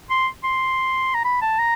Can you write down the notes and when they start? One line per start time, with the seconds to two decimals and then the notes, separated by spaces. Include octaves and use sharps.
0.10 C6
0.43 C6
1.14 A#5
1.25 B5
1.42 A5
1.58 A#5